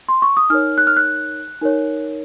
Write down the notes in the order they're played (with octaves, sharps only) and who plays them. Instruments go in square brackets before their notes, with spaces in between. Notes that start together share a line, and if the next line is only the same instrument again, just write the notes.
[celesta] C6
C#6
D#6
D#4 A#4 C#5 F6
F#6
F6
F#6
D#4 A#4 C#5